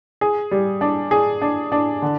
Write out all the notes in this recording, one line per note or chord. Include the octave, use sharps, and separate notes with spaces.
G#4
G3
D4
G#4
D4
D4
D3